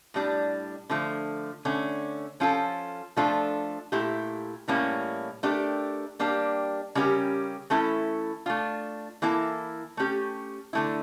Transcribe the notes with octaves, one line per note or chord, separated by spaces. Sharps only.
A2 G3 D4
D3 F3 A3
D3 A3 C#4
F3 C#4 F4 A4
F3 A3 D4 F4 A4
A#2 A3 E4 G4
A2 E3 G3 A#3 C#4
A3 D4 G4 A#4
G3 A#3 D4 G4
C#3 G3 C#4 G4 A#4
E3 A3 C#4 E4 A4
A3 D4 F4
E3 A#3 E4 A4
A3 C#4 G4
D3 A3 E4